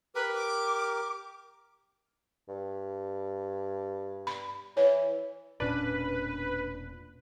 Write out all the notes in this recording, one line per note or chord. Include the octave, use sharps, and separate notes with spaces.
G4 A#4 B4
D6
G2
B5
E3 C#5
E1 A#2 C#4 D4 B4